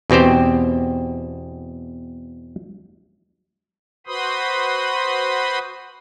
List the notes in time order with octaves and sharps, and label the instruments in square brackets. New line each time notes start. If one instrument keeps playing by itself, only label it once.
[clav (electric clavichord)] E2 B2 C4 G4 C5
[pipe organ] F#4 B4 C5 B5 C6 D#6